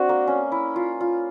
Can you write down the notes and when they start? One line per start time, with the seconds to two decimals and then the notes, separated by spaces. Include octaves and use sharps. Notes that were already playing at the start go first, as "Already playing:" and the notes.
Already playing: C4 D4 F#4
0.09 A#3
0.27 C#4
0.52 E4
0.76 F4
1.00 F4